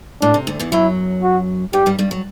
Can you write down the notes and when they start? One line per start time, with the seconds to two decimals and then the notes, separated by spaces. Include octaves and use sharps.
0.22 A2 D4
0.34 C3
0.47 D2 D3
0.60 E2 E3
0.72 F#2 F#3 E4
1.23 F#4
1.73 G2 G3 G4
1.86 G2 G3
1.99 G2 G3
2.11 F#3